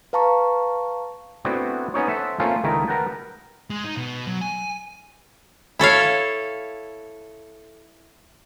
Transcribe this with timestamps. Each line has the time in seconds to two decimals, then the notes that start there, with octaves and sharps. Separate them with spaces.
0.13 B4 F5 A5 A#5 C#6
1.45 A3 B3 C4 D4 E4 F#4
1.94 B3 C#4 D#4 C#5
2.08 A4 C5 E5 F#5
2.40 A3 A#3 C4 C#4 F4 A4
2.64 C#2 D#3 A3 D#4 E4 A#4
2.88 A#4 B4 F#5 G5 A5
3.70 G#3
3.85 D#4
3.97 B2
4.28 F#3
4.41 G#5
5.79 E4 A4 C#5 F5